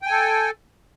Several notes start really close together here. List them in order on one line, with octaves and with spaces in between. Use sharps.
G5 G#5 A4